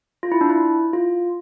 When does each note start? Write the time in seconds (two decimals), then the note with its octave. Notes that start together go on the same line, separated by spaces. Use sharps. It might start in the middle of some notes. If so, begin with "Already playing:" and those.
0.23 F4
0.32 E4
0.41 D4
0.50 E4
0.93 F4